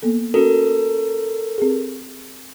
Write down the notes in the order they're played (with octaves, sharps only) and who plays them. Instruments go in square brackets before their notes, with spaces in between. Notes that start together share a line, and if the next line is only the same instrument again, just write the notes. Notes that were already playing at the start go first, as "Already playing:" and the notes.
[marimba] A#3 B3 A4
[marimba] C#4 F#4 [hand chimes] A4 A#4
[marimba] C4 G4 G#4